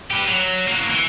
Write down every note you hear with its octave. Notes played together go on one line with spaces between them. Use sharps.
G4 B4
F#3
A#3 F#4
E3